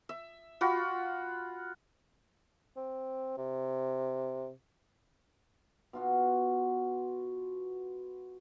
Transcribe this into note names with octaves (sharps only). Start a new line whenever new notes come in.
E5
F4 F#4 B5
C4
C3
B2 F4 F#4